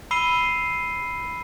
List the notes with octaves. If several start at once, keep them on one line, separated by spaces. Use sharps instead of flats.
B5 E6 C7 D#7 G7